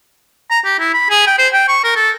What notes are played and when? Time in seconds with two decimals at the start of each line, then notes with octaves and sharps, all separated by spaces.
0.50 A#5
0.65 G4
0.79 E4
0.94 B5
1.10 G#4
1.27 G5
1.39 C5
1.53 G5
1.68 C#6
1.84 A#4
1.96 A4